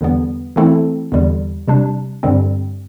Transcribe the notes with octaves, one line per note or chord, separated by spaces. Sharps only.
E2 D3 G3 B3
E3 A3 C4 E4 A4
E2 D3 G3
C3 G3 D4
G2 D3 G3 C4